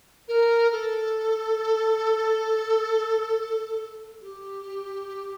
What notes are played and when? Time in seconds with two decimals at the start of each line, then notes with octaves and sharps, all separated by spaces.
0.28 A#4
0.71 A4
4.22 G4